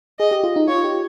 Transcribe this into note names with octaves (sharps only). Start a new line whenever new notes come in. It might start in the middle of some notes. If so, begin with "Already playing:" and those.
G#4 D#5
G4
F4
D#4
F4 C#5
G4